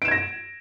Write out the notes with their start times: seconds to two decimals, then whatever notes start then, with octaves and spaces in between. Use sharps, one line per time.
0.02 D7
0.05 E7
0.08 G#6
0.11 A#6